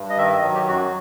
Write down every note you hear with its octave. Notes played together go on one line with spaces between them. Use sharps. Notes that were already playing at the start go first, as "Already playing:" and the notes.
Already playing: G2
D#5
D#3 E5
D#5
F#3
G4
F#2 F#4